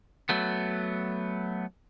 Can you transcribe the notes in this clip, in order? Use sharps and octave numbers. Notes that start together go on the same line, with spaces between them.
F#3 A3 B3